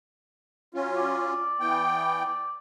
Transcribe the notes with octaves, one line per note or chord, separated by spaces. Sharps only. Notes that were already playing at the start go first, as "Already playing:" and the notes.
F#3 C#4 F4
D5
E3 B3 G5